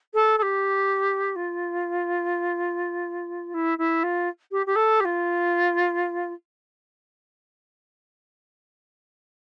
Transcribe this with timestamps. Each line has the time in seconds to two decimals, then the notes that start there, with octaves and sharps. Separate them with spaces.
0.14 A4
0.38 A4
0.42 G4
1.35 F4
3.54 E4
3.78 E4
4.03 F4
4.51 G4
4.66 G4
4.75 A4
5.00 G4
5.05 F4